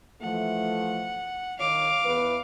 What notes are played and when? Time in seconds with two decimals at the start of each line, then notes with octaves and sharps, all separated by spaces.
0.22 E3 F3 A3 F#5
1.59 D#3 D#4 C#5 F5 D6
2.05 E2 B4